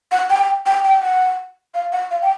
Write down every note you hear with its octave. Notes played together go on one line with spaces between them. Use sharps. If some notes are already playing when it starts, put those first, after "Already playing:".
F#5
G5
G5
G5
F#5
F5
F#5
F5
G5